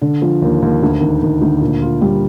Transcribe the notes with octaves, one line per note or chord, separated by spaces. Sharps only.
D3
F3
D#2
D#2
D2
D#3
D#3
D2
A#2
F4
G3